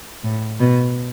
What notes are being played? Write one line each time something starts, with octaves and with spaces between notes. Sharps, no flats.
A2
B2